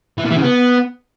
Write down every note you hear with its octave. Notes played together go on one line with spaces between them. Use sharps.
E3
A#2
E3
C#3
B3